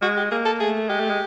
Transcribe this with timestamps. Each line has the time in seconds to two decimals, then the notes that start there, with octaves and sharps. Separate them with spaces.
0.02 G#3 F#4
0.17 G4
0.31 A#3 G#4
0.46 A4
0.60 A3 G#4
0.89 G#3 G4
1.00 A3
1.10 G#3